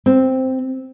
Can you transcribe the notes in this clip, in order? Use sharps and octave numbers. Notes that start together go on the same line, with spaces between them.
C4